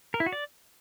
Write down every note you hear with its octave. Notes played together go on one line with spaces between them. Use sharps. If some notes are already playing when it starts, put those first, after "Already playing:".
A#4
E4
F#4
D5